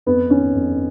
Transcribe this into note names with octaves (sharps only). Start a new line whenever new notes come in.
F2 B3
D#3 C#4
F2